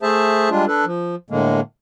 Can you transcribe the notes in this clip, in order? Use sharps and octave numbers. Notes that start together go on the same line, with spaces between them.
A3 G#4 C5 E5 A5
G3 G#3 D4 F4
D4 A4 B4
F3
A2 D3 G#3 A#3